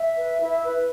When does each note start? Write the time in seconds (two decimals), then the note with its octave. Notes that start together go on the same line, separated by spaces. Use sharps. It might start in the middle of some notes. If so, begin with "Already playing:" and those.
Already playing: E5
0.15 B4
0.39 E4
0.63 B4